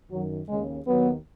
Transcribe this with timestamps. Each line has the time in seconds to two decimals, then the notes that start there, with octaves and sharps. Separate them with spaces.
0.10 F#2 D#3 F#3
0.48 D#2 C#3 G#3
0.86 D#2 D#3 F#3 B3